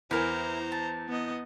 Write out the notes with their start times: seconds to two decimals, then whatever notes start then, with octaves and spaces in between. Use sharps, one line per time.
0.11 E2 E4 A#4 C5 G#5 A#5
0.72 A5
1.08 B3 D#5